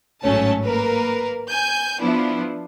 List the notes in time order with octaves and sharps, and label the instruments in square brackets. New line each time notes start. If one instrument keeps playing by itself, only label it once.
[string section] G#1 A2 F#3 A3 C#4 A5
A#3 A#4 B4
G#5 G6
F3 B3 D4 E4